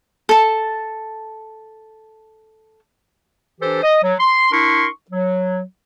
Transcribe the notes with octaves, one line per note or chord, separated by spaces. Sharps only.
A4 A5
E3 D4 G4 A4 C5
D#5
F#3
C6
D4 E4 A#4 C6 C#6
F#3